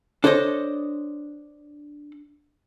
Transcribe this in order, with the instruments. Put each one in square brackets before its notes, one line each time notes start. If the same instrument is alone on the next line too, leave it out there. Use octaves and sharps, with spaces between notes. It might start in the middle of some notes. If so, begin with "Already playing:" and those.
[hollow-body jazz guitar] D4 A4 C5 C#5 D#5